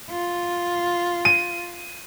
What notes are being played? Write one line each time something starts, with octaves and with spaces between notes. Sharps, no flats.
F4
D#7